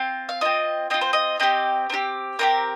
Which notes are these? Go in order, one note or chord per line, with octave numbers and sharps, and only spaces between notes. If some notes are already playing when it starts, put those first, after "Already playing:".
Already playing: C4 F4
F5
C4 F4 D#5
C4 F4 D#5
C5
D#5
C4 D#4 G4 D#5
C4 D#4 G4
C4 D#4 G4 A#4